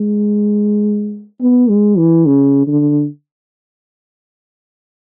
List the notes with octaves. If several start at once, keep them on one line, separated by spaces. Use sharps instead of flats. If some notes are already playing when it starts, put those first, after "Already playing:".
Already playing: G#3
B3
G#3
E3
C#3
D3